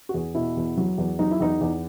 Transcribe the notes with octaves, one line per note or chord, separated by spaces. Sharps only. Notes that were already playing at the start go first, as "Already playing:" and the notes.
F#4
E2 G#4
B2 E4
E2
F#3
E2
F#3 D#4
E4
E2 D#4
E2